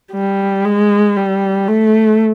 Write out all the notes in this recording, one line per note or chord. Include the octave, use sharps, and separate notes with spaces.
G3
G#3
G3
A3